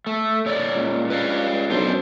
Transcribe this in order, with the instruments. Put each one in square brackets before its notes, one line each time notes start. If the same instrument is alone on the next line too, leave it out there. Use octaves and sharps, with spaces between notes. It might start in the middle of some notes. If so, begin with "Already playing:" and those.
[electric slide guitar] A3
A#2 C#5 D5
[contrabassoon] C#2
[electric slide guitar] B4 D5 F5
[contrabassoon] B1 [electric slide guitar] D4 C5
[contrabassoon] F#2